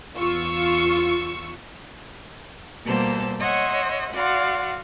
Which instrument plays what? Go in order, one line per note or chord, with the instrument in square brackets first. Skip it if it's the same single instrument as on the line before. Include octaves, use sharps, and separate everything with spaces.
[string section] E2 F4 C#6 E6
[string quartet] B2 G3 A#3 C5 A5 E6
C#5 D#5 E5 F#5 C6
F#4 D5 F5 F#5 C6